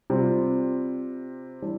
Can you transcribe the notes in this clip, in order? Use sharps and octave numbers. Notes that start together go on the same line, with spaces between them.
C3 G3 C4 F4
E3 G3 D4